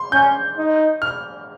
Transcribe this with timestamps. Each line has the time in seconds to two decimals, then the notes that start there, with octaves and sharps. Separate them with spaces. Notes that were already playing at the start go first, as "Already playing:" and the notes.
Already playing: C6
0.12 C#4 G6
0.58 D#4
1.02 F6